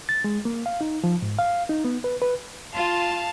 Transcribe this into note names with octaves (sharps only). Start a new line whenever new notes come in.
A6
G#3
A#3
F5
D#4
F3
G#2
F5
D#4
B3
B4
B4
F4 F5 A5